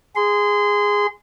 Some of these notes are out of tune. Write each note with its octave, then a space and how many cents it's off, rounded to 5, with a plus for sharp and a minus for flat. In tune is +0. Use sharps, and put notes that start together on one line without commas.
G#4 -10 C6 -25